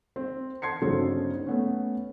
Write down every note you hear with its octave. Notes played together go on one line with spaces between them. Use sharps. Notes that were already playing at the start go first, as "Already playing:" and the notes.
C4
A5 C6 G#6 C7 C#7
G1 C#3 F#3 D#4 A4 C5
A3 B3 C#4